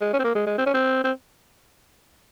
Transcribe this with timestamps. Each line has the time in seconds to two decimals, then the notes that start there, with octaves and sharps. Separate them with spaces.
0.01 G#3
0.13 C#4
0.20 C4
0.24 A#3
0.35 G#3
0.46 G#3
0.58 C4
0.66 C#4
0.74 C4
1.04 C4